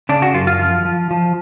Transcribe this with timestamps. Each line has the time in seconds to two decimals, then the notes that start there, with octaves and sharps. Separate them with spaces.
0.09 C#3 D4
0.22 F#4
0.34 F#2 F4
0.47 F4
0.59 F3 F4
0.85 F3
1.11 F3